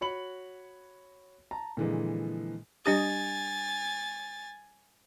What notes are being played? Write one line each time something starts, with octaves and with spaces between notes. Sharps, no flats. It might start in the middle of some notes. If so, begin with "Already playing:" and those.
F#4 C#5 B5 C#7 F#7
A5 A#5
A#2 D3 E3 F3 G#3
G3 D4 G4 G#5 A6